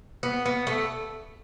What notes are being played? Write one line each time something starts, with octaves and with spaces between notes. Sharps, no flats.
B3
B3
A3